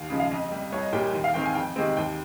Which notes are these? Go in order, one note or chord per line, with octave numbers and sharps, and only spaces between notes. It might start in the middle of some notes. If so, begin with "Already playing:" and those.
Already playing: D#2 F5
C#3 F3 G#3
F5
F2 D#5
C3 G3
C2 C#5
D#5
A#2 G3 G5
D#2
F5
D#3 G#3 C4 G5
G#5
F2 G5
C3 D#3 G#3 C4
D#2 G5